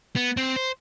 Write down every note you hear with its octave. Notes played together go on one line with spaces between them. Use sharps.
B3
C4
C5